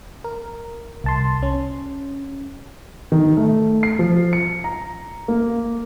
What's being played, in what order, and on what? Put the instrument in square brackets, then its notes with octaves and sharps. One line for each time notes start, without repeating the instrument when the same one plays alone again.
[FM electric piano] A#4
C2 A5 C6
C#4
[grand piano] D#3
A3
C7
F3
C#7
A#5
A#3